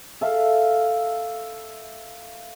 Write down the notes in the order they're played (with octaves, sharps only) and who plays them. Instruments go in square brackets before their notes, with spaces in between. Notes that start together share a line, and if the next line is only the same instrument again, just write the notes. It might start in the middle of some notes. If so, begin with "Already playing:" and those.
[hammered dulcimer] A4 E5 F5